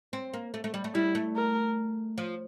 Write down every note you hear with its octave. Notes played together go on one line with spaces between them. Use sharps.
C4
A#3
A3
A3
G3
A3
G3 E4
A3
A#4
F3